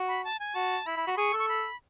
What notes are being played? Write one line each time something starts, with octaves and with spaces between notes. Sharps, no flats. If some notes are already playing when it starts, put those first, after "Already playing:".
Already playing: F#4
B5
A5
G#5
F#4 A5
E4 B5
E4
F#4
B5
G#4 C#6
A4
C#6
B5